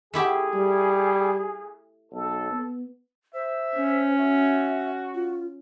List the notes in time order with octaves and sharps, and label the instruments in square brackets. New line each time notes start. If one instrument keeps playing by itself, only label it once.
[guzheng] A3 E4 G4 [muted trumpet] G#4
[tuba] G3
[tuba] B1 [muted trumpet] A4
[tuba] B3
[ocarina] C5 [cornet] E5
[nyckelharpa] C#4
[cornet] F#4 [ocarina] E5
[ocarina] F4